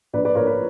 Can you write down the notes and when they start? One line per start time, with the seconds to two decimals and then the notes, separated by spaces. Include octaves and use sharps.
0.13 A#1 B4 D5
0.25 B4 D5
0.35 A#1 A#4 C#5
0.46 B4